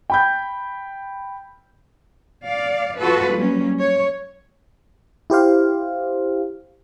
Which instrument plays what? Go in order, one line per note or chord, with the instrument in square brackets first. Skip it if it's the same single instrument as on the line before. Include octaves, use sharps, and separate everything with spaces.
[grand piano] G5 B5 G6
[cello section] D5 F5
F4 F#4 A4 B4
F#3 G3 A#3 C#4
C#5
[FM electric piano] E4 G4 C5 F5